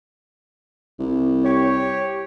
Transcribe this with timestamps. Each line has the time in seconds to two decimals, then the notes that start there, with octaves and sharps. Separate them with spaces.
0.99 C2
1.45 G4 C#5